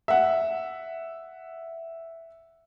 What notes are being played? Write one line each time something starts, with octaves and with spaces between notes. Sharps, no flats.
E5 F#5